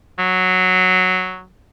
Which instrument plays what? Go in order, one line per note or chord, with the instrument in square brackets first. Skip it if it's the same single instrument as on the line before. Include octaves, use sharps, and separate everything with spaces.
[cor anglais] F#3